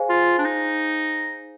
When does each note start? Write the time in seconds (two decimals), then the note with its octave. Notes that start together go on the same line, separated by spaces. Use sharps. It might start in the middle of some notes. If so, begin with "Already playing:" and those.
Already playing: G#4 C5 F5 G#5
0.09 F4
0.38 D4
0.45 D#4